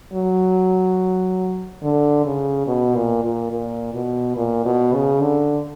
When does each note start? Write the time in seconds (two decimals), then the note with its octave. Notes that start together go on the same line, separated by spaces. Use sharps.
0.13 F#3
1.83 D3
2.25 C#3
2.67 B2
2.96 A#2
3.24 A#2
3.52 A#2
3.94 B2
4.37 A#2
4.65 B2
4.93 C#3
5.21 D3